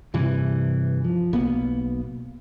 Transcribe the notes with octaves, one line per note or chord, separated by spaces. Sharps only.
G2 C3 E3
F3
B1 A#3 B3